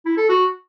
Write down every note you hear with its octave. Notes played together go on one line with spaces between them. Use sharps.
E4
A4
F#4